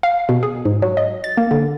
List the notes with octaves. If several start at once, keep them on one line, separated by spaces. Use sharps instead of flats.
F5
B2
G#4
G#2
F#3
D#5
A6
A#3
D3